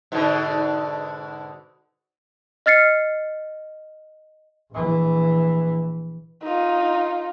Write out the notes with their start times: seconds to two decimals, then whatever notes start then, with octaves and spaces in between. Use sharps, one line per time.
0.12 G#2 B2 D3
2.66 D#5 F6 A6 C7 C#7
4.72 A#1 E3
6.43 D#4 F4